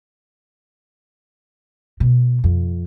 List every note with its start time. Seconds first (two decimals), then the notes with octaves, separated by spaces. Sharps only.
2.00 B2
2.44 F2